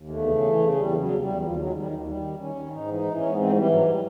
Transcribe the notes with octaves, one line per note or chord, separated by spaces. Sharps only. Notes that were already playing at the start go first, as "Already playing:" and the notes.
Already playing: D#2
E2 A3
C#3
E3
C#3
E2 G3
C#3
F#3
E2
G3
E2
D#2 F3
D#3 F#3
G#3
D#3 G3
D#2
D#3 G3
D#3
D#3 C#4
D#3
G#2 D#4
E3
D#4
E3
C#4
G#2
B3
E3 C4
E3 G3
G#2 F#3
G3